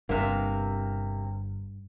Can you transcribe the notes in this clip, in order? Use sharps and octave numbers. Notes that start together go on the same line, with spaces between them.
G1 G2 C3 A#3